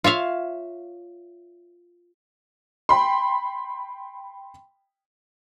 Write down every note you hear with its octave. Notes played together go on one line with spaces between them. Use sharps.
F4 C#5 E5 F5
G5 B5 C6